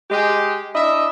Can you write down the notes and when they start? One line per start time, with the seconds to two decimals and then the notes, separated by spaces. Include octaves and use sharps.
0.10 G#3 G4
0.74 D4 E4 D#5 E5